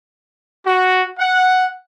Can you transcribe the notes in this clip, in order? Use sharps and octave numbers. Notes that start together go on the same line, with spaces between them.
F#4
F#5